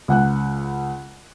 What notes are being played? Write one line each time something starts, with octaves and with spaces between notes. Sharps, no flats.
C#2 F#5 F#6